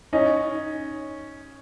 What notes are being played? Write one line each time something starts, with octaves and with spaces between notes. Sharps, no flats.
C#4 D#4